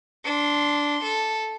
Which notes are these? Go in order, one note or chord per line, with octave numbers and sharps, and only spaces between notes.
D4 C6
A4